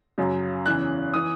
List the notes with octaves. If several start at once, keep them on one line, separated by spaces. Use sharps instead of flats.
F#2 C#3 F#3
E2 C#3 E3 F#6
E3 D#6